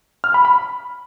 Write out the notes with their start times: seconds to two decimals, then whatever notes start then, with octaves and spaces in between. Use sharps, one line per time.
0.24 F6
0.34 B5
0.45 B5